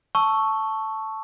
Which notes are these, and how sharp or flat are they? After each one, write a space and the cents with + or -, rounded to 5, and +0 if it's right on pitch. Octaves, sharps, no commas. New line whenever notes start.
A5 +0 C#6 +0 E6 +0